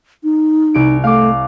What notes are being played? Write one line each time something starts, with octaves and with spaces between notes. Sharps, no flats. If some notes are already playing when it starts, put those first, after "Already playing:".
D#4
C2 D7
A3 F5 D6